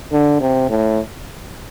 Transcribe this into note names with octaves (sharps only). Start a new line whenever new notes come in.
D3
C3
A2